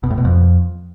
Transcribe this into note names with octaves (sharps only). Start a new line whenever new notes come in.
B2
A2
B2
F2